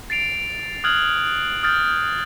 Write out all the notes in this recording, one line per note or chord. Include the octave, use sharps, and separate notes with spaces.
A6 C7 D7 F7
D#6 F6 F#6 G#6 F#7
D#6 F6 G6 A6